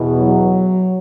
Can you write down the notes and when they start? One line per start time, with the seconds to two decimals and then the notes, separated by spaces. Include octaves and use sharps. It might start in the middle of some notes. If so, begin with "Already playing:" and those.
Already playing: E2 B2
0.18 F#3